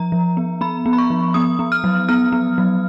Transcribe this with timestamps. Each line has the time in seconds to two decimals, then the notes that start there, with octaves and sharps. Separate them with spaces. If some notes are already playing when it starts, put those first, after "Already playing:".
Already playing: F3 A#5
0.12 F3
0.37 B3
0.61 B3 B5
0.86 B3
0.93 B5
0.98 C#6
1.10 F3
1.34 B3 D#6
1.59 B3
1.72 F6
1.84 F#3
2.09 B3 F6
2.32 B3
2.58 F#3